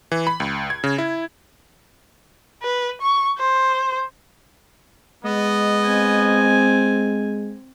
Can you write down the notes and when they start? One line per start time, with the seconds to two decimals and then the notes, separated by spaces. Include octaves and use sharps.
0.12 E3
0.27 B5
0.40 C#2
0.70 G#6
0.84 C#3
0.98 E4
2.62 B4
3.01 C#6
3.39 C5
5.25 G#3 B3 D#5
5.85 C4 G#5